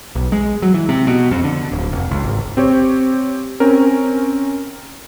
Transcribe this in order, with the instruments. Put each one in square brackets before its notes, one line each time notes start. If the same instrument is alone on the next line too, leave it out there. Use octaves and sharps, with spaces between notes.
[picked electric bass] B1
G#3
F#3
E3
C3
B2
F2
D3
D1
F1
C#2
G#1
[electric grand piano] C4 G4 C#5
C4 C#4 A#4